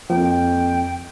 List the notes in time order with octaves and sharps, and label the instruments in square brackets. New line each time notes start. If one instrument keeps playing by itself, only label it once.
[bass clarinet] F2 [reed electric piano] F3 A#3 [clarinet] G5